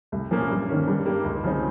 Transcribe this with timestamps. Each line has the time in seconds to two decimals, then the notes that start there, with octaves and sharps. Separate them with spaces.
0.12 C2
0.31 A#2 F3 A#3 C#4
0.50 G2
0.69 D#3 A#3 C#4
0.87 G2
1.06 G3 A#3 D#4 G4
1.24 C#2
1.44 C#3 F3 C4 D#4